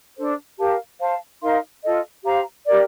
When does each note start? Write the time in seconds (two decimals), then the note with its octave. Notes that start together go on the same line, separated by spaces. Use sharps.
0.17 D4 A4 C5
0.58 G4 A#4 F5 A5
1.00 C5 F5 A5
1.42 D#4 A#4 F5 C6
1.84 F4 A4 D#5
2.24 G4 C5 F5 A#5
2.66 G4 A#4 D5